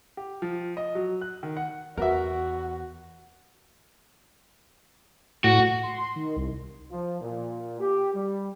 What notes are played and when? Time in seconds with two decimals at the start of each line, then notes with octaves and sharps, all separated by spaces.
0.17 G4
0.42 F3
0.77 D#5
0.95 F#3
1.21 F#6
1.43 D#3
1.57 F#5
1.97 E2 F#4 A#4 B4 E5
5.44 A2 F#4
5.83 C6
6.16 D#3
6.36 C2
6.91 F3
7.22 A#2
7.80 G4
8.14 G3